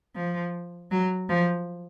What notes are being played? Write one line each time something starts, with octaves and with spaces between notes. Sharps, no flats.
F3
F#3
F3